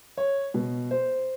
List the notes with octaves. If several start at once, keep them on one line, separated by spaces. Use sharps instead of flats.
C#5
B2
C5